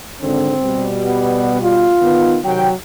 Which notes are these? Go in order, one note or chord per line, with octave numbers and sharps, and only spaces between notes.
G#1 E2 D3 C4
B2 G3
B3
F4
D#3 B3
C3 D#3 F#3 G5